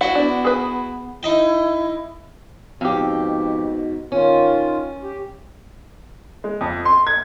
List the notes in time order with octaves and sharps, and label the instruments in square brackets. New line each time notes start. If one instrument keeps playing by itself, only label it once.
[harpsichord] E4 F#4 G5 [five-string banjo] F#5
[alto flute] B3 [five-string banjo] D4
[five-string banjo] G#4 B4
[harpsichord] D#4 D#5 G5 [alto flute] E4
[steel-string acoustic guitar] F2 G4 [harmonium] G#2 B2
[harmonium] D#3 F4 [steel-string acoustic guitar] C#4
[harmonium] G4
[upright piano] G#3
F2
C6
G#6